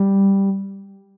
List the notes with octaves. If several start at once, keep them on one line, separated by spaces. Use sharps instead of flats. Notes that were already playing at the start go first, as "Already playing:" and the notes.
Already playing: G3